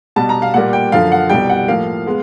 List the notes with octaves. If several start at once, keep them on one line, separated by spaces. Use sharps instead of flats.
B2 G3 B3 A5
A#5
F5
A#2 G3 A#3 F#5
G5
F#2 D3 F3 F5
F#5
C2 B2 G3 G5
F#5
A2 F3 A#3 F5
G#3 B3